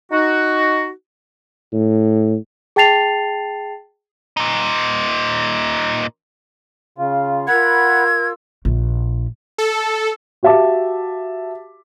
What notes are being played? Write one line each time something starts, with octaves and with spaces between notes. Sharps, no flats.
D#4 F#4
A2
G#4 G5 A5 A6 C7 F7
A#2 D#4
C#3 F4
F4 A#4 F#5 B5 E6 G#6
A#1
A4
F#4 G4 E5 F5 A5 D6